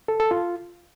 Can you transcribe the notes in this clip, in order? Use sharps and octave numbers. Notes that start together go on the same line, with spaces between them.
A4
A4
F4